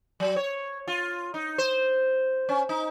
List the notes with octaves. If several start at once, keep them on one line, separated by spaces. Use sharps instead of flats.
F#3
C#5
F4
D#4
C5
C#4
D#4